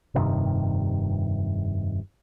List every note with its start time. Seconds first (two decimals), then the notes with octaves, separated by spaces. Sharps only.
0.14 F1 G2 C3 D#3